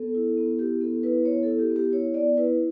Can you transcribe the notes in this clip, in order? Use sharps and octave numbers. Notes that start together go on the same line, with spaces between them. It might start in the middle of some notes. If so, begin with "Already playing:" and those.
Already playing: B3 A4
E4
B3
E4 G4
B3 A4
E4 B4
B3 C#5
A4
E4
G4
B3
G4
E4 C#5
B3 D5
E4 B4